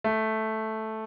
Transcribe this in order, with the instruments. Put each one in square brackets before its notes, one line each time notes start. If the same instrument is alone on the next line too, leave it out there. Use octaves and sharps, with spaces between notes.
[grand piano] A3